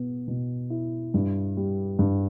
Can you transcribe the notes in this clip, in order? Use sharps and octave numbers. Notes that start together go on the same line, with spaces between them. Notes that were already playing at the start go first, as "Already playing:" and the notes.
Already playing: B2 B3
B2
E4
G2
G3
G2